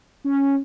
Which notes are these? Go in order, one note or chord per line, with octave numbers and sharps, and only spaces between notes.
C#4